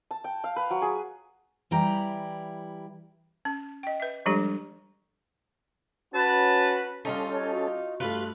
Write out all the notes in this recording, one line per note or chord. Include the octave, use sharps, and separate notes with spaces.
A5
G5
F5
B4
F#3
G#4
E3 G3 E4 G5 A#5
C#4
D#5 G5
B4 E5
F3 G3 G#3 D4 G4 A4
C#4 F#4 B4 A5
G3 C#4 D#4 F4 G4 A4 D#5
C#5
F#4
G2 A3 F4 B4 F#6